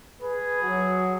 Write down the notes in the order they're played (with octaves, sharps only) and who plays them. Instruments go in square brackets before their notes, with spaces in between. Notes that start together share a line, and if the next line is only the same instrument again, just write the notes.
[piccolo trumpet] G#4 [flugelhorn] B4
[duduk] F#3 [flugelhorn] F#4